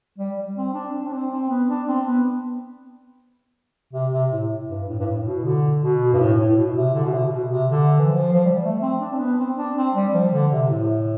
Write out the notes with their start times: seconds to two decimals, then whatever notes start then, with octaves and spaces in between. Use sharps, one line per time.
0.18 G3
0.37 G3
0.56 C4
0.74 D4
0.94 C4
1.07 D4
1.13 C4
1.32 C4
1.50 B3
1.69 D4
1.88 C4
2.07 B3
3.93 C3
4.12 C3
4.32 A2
4.69 G2
4.88 A2
4.99 G2
5.07 A2
5.25 B2
5.43 D3
5.82 B2
6.13 G2
6.19 A2
6.39 A2
6.56 B2
6.76 C3
6.94 D3
7.05 B2
7.13 C3
7.32 B2
7.51 C3
7.70 D3
7.99 E3
8.08 F3
8.34 F3
8.45 G3
8.64 A3
8.81 C4
9.00 D4
9.14 C4
9.20 B3
9.38 C4
9.57 D4
9.76 C4
9.95 G3
10.13 F3
10.33 D3
10.52 C3
10.70 A2